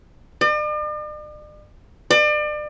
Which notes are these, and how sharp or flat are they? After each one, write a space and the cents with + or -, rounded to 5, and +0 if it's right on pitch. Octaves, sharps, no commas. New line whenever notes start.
D5 +45
D5 +35